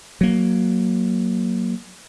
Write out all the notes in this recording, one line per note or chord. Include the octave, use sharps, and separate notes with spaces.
F#3 A#3